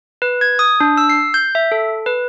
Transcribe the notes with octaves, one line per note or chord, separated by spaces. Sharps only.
B4
G#6
D#6
D4
E6
C7
G6
E5
A4
B4